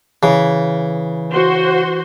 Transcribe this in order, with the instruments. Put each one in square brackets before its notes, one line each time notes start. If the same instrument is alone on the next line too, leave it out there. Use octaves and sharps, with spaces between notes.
[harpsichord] C#3 [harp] E3
[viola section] F#4 C5 C6